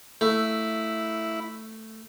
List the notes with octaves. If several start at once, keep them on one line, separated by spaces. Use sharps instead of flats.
A3 E4